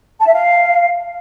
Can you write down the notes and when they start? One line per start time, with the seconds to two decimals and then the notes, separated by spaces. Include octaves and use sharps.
0.19 A5
0.26 E5
0.34 F5